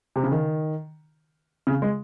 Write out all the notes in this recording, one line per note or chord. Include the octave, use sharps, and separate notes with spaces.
C3
C#3
D#3
C#3
G#3